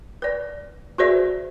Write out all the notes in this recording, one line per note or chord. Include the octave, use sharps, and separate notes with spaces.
B4 D5
F#4 G#4 B4 C5 D5 E5